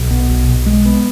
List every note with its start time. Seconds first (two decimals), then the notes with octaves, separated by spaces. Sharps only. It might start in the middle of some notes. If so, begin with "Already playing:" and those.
Already playing: B1
0.11 B2
0.30 B1
0.48 B1
0.66 G#3
0.85 B3